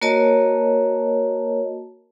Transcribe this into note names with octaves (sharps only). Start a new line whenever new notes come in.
A#3 F#4 A#4 C#5 D#5 A5